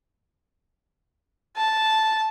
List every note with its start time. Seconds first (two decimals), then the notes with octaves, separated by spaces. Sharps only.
1.57 A5